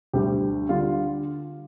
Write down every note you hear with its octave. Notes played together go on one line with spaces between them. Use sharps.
D2 D3 G3 G4
D3 G3 F4